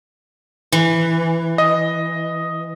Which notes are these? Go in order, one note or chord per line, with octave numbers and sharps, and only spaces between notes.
E3
D#5